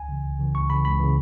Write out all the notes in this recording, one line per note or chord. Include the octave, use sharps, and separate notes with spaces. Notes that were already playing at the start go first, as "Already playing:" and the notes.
Already playing: C#2 G#5
C#3 E3
C#2
C#3 E3
C#2 C#6
C#3 E3 B5
C#2 B5
C#3 E3